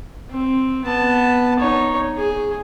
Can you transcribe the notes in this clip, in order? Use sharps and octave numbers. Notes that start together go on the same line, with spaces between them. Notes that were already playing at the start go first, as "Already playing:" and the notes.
C4
B3 A5
D#4 C#5
G#4